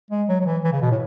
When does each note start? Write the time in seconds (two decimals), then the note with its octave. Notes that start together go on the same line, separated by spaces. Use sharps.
0.11 G#3
0.29 F#3
0.40 F#3
0.46 E3
0.64 E3
0.72 C#3
0.82 B2
0.91 A2